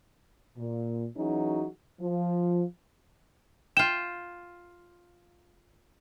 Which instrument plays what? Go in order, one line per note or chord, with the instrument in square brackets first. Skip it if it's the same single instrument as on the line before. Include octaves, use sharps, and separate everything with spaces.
[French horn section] A#2
E3 F#3 C#4 D#4 F#4 G#4
F3
[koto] F4 G5 [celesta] E7